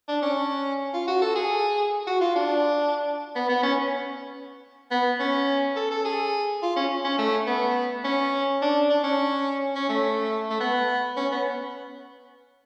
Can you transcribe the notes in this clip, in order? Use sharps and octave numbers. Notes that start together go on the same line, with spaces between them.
D4
C#4
F4
F#4
A4
G#4
F#4
F4
D4
B3
B3
C#4
B3
C#4
A4
A4
G#4
F4
C#4
C#4
A3
B3
C#4
D4
D4
C#4
C#4
A3
A3
B3
C#4
B3